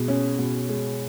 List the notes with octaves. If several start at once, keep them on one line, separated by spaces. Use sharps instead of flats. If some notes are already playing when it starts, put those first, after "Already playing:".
Already playing: B2 G#3
C#4
B2
G#3